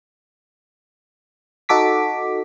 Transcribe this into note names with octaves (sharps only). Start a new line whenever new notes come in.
D#4 F#4 A4 D6 B6